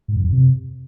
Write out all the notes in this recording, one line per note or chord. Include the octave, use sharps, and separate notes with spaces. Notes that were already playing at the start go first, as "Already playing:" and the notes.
G#2
F#2
F2
C3